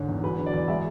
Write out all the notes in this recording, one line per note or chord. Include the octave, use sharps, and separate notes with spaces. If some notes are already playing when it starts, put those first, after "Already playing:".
Already playing: G#2 D3 G#3 C#5
E2
F#3 B4
D3
D5
E2
G#3 E5